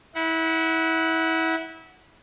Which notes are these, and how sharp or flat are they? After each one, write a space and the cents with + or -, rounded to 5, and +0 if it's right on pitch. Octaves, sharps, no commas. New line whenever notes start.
E4 -25 F#5 +0